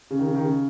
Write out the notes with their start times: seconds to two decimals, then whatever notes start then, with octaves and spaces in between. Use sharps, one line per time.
0.11 C#3
0.19 D#3
0.27 C#3
0.35 D#3
0.44 C#3